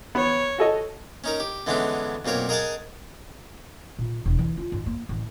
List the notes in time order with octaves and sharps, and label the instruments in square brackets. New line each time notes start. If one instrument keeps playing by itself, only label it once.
[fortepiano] B3 [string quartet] C#5
[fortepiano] F#4 A4 D#5
[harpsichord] C#4 D#4 A#4
G4
D3 E3 G#3 B3 C#4 D4
B1 A#2 C4 A#4 C#5
G#4 A#4 D#5 F#5 G#5 A5
[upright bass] A#2
E1
E3
F4
G#1
A#3
A1